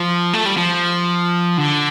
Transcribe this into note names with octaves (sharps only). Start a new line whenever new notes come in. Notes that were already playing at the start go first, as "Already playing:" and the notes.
Already playing: F3
A3
G3
F3
D3